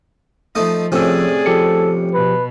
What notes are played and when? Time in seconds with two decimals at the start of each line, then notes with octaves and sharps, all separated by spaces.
0.55 F3 A3 D#4 D#5
0.92 A2 C3 F3 C#4 G#4 D5 E6
1.46 F3 G4 A4 C#7
2.14 B2 B4